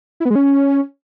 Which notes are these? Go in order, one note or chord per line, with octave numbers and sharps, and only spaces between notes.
E4
B3
G#3
C#4